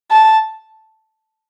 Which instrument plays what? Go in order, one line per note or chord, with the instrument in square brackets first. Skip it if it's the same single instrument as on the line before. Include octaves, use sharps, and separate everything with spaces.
[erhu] A5